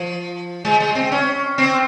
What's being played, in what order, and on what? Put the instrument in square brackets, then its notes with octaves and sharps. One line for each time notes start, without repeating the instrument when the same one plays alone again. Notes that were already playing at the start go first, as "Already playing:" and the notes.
Already playing: [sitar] F3
G#3
G#3
C4
C#4
C4